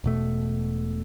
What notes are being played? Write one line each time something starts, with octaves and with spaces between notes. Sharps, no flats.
E1 B2 A3